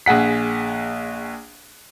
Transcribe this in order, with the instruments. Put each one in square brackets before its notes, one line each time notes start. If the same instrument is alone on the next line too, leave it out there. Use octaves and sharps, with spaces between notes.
[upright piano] A#1 G#4 F#5 B6